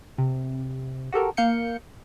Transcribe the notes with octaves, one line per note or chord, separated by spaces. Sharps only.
C3
F#4 G4 A4 A#4
A#3 F5 G6 C#7